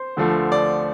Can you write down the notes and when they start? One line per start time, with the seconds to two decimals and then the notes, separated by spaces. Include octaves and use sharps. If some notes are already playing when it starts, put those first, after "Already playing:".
Already playing: C5
0.17 D2 D3 F3 A3
0.52 D5